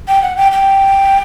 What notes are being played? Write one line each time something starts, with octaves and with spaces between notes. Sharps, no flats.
G5
F#5
G5
G5